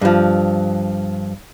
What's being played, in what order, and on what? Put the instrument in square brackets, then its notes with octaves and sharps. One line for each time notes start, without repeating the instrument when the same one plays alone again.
[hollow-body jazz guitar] G2 F3